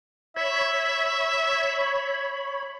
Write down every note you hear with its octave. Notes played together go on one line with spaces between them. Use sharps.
C#5 E5 B5